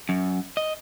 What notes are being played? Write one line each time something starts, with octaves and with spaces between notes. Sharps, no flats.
F#2
D#5